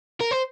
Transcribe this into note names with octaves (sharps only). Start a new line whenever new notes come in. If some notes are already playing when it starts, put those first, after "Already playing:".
A#4
C5